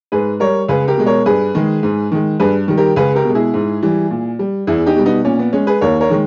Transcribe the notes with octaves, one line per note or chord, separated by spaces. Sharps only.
G#2 G#4 B4
G3 A#4 C#5
C#2 G#4 B4
G4 A#4
B2 G#3
A#4 C#5
G2 G#4 B4
D#3 G#3
G#2
D#3 G#3
G2 G#4 B4
D#3 G3
G4 A#4
C#2 G#4 B4
G4 A#4
B2 G#3
E4 G#4
G#2
E3 G3
A#2
G3
E2 E4 G#4
D#4 G4
B2 G3
B3 D#4
A#2 C#4
B3
G#3 C#4
G#4 B4
D#2 A#4 C#5
A#4 C#5
D#3 G#3